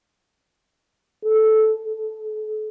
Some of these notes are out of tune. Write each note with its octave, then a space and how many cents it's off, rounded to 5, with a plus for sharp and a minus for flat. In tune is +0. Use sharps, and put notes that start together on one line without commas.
A4 -10
A4 -40